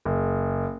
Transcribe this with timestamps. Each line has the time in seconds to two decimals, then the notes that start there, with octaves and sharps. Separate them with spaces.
0.05 F#1